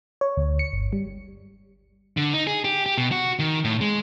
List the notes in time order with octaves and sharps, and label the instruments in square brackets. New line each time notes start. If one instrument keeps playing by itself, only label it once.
[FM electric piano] C#5
D2
C#7
G1
G3
[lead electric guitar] D3
D#4
G#4
G4
G4
B2
F#4
D#3
A2
G#3